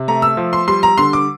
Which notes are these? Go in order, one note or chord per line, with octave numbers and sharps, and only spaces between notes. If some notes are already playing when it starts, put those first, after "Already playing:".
Already playing: C3
A3 A#5
E6
F3
C6
G3 C6
A#5
D3 C6
D6